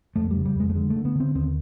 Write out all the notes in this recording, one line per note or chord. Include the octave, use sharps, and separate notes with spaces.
F2 A3
C#3 G3
G3
F2 G#3
A3
D3 G#3
A3
D3
B3
D3 C4
D#2 C4